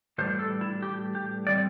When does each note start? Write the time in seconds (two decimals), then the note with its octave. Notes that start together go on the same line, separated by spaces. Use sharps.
0.18 A2 E3 G3 D4 C5
0.39 A4
0.61 E4
0.82 G4
1.15 G4
1.47 G3 C4 D5